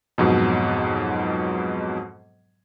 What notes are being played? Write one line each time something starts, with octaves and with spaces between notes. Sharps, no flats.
F2 G#2 B2 F#3